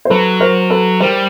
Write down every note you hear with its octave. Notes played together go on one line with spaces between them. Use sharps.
C5
F#3 A4 B4
A#4 C5
A4 B4
G3 A#4 C5